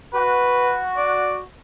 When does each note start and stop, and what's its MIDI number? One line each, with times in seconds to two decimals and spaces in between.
0.13 1.41 66
0.13 0.78 71
0.97 1.37 74